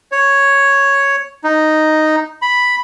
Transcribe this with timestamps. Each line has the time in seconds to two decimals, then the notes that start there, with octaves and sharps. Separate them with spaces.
0.12 C#5
1.44 D#4
2.42 B5